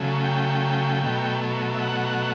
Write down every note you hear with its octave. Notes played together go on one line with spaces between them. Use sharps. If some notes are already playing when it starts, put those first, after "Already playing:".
Already playing: C#3 F#3 A3
G5
B2 F#3 A3
E5
F#5